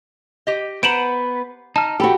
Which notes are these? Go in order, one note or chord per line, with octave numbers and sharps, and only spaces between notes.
G4 D#5
B3 B4 C5 F#5 A#5 D7 E7 F#7
D#4 A5 F6
E3 F#4 G4 A4 G5 B5